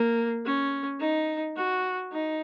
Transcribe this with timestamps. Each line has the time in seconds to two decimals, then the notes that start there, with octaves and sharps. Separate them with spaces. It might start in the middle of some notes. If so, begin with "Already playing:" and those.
Already playing: A#3
0.45 C#4
1.00 D#4
1.56 F#4
2.12 D#4